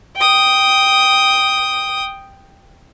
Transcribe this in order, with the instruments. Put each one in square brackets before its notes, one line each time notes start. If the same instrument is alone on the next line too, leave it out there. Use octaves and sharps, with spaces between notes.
[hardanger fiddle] G5 D#6